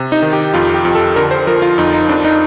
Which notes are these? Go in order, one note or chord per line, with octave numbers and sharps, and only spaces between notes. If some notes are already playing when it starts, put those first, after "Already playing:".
Already playing: C3
D#4
D#3
G4
F2 F4
G4
F2
A4
D3 A#4
C5
F3 A#4
F4
F2 D#4
D#4
F2 D4
D#4